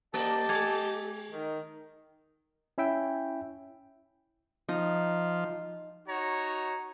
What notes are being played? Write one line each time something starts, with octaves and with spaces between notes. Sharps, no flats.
A3 G4 D5 D#5 A5
G#3 G#5
D#3
C#4 E4 E5 G5
F3 D#4
D#4 F#4 C#5 A#5